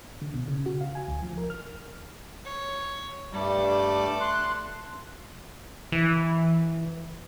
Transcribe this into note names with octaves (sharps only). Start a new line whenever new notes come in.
D3
B2
C#3
F#4
F5
G#5
D2
F3
A#4
F6
C#5
G2 G3 A3 D5
C6 F#6
E3